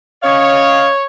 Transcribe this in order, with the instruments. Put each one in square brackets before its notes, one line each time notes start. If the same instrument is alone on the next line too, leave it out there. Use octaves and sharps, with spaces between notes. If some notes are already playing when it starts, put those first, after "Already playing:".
[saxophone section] C#4 D#5 F5 [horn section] C#5